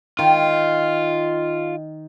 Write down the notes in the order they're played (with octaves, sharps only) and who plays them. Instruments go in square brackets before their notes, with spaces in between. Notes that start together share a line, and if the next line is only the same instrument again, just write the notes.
[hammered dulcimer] D#3 [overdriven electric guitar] F4